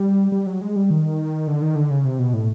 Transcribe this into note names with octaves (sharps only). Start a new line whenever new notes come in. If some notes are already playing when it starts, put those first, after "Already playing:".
Already playing: G3
G3
F#3
G#3
G3
D#3
D3
D#3
D3
C#3
C3
B2
A2